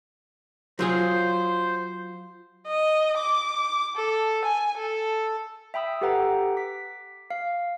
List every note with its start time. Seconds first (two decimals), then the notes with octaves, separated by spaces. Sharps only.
0.79 F#3 F4 G#4 C5
2.67 D#5
3.18 D6
3.96 A4
4.45 G#5
4.77 A4
5.74 E5 G5 B5 D#6 E6
6.01 G4 A4 B4 F#5 G5 A#5
6.57 D6 B6
7.31 F5